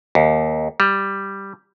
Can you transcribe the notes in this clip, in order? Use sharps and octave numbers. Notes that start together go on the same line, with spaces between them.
D#2
G3